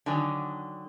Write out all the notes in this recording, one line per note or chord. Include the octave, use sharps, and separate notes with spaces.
D3 D#3 F#3 D4 G#5